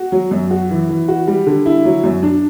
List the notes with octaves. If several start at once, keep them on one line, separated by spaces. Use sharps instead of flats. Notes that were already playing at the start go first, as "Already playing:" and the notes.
Already playing: F#4
F#3
F#2
F#4
E3
E3
F#4
G3
D3
E4
F#3
F#2
D4